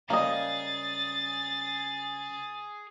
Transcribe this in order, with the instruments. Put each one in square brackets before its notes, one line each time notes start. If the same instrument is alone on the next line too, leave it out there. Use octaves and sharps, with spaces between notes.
[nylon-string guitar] C#3 G3 C#4 [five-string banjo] A#3 D#5 [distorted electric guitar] G#4 [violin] A6